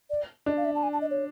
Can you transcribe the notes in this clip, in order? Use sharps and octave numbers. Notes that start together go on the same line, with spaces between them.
D5
D4 D#5
F5
E5
A5
G#5
A5
D#5
C#5